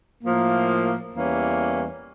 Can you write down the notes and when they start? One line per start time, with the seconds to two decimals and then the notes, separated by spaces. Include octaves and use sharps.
0.22 A2 F3 A#3
1.13 E2 E3 G3 A#3 C#4